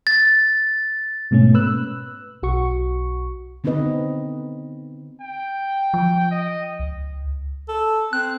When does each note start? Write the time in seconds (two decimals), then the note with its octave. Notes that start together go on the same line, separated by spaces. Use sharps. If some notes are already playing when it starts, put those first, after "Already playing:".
0.07 A6
1.31 G#2 B2 A3 A#3 C#4
1.54 B4 E6 F#6
2.43 B1 F#4 C#6
3.64 D3 B3 C4 D#4 B4 D#5
5.22 G5
5.94 F3
6.32 D#5
6.79 C#2
7.69 A4
8.13 C4 F#6